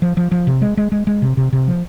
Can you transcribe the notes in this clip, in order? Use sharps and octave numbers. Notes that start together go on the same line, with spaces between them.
F3
F3
F3
C3
G#3
G#3
G#3
G#3
C3
C3
C3
F3